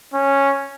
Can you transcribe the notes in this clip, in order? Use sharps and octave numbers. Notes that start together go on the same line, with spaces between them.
C#4